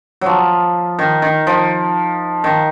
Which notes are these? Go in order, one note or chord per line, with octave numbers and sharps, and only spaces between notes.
F3 F#3
D#3
D#3
F3
D#3